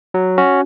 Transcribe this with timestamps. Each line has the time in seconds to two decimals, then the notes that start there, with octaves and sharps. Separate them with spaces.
0.14 F#3
0.38 C#4 F#4